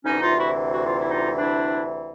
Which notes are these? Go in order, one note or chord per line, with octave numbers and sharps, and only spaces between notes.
D2 C3 E3 C#4 D#4
D#4 F4
E4 F#4
F#4
F4
E4
D#4 F4
D4 E4